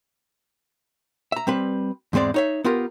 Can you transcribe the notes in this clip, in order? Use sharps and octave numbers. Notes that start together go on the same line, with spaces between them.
E5 A#5
G3 C4 B4
E2 G#2 G#3 C4 D5
D#4 C#5 E5
B3 F4 G4 A#4